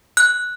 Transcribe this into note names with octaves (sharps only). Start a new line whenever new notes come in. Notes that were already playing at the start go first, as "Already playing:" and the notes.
F#6